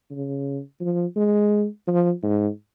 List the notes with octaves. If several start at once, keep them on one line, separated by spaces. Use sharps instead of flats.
C#3
F3
G#3
F3
G#2